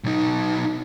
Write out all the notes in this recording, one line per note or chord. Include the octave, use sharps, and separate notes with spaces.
B1 D#4